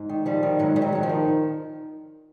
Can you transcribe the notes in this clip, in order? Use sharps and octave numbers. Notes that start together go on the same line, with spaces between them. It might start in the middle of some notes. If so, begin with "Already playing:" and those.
Already playing: G#2
D#3
D#3 F3 G3
D#3
G#2 F#3
D#3 G3
F#3
D#3 F#3
F3
D#3